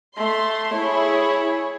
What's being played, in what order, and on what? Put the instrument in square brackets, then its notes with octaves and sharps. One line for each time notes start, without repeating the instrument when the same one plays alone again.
[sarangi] A3 [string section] C6
[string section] E4 G#4 [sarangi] C#5